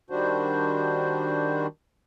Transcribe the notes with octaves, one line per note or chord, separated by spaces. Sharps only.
D#3 G3 D4 F#4 C5